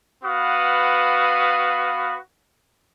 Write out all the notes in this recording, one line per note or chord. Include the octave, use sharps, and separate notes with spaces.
B3 F#4 B4 F5 D#6